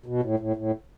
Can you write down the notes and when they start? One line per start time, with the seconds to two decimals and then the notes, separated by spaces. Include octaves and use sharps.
0.06 B2
0.23 A2
0.40 A2
0.56 A2